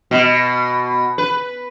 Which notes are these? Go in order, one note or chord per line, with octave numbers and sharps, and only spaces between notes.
B2
B4